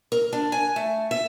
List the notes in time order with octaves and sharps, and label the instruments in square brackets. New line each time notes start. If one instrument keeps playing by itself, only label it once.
[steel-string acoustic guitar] A#4
D4
G#5
A3
E5